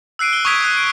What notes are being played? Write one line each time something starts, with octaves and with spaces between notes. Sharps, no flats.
E6 F#6 C7 D7 D#7
G7
C#6 D#6 G#6 B6 D7
D#6 F#6
D7